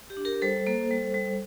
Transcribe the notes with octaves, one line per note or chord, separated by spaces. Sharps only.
G4
D4
G4 A#4
G3 A4 C5
A#3 A4 C5
G3
G3